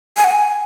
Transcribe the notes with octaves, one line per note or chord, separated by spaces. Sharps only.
G#5
F#5
G#5